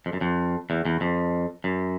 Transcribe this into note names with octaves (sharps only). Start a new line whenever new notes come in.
F2
F#2
F2
E2
E2
F2
F#2